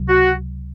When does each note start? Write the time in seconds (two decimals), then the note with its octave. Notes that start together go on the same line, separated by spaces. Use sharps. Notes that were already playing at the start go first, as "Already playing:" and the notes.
Already playing: C#2 C3 F#3
0.09 F#4